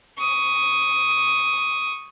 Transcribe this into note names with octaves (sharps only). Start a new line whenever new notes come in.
C#6 D#6